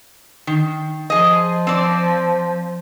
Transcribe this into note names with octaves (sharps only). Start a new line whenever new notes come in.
D#3
F3 G#4 D#5
C4 D5